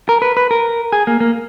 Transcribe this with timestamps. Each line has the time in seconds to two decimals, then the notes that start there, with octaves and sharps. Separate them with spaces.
0.09 A#4
0.22 B4
0.37 B4
0.51 A#4
0.92 G#4
1.07 A#3
1.20 A#3